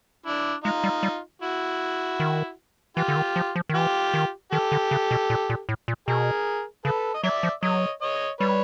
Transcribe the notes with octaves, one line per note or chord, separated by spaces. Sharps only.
D4 E4
G#3 D#4 F4
G3
G3
E4 F#4
D#3
E3 F4 G4
D3
D#3
F3
F3
D#3
E3 F4 G4
D#3
D#3 G4 A4
D3
C#3
B2
A#2
A#2
A2
A#2
B2 G#4 A#4
C#3 A4 B4
D#5
F#3 D5 E5
F3
F#3 C#5 D#5
C#5 D#5
G3 B4 C#5